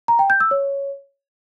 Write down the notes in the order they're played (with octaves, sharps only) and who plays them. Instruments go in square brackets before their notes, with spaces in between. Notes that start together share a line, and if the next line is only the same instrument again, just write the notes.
[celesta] A#5
G5
G6
E6
C#5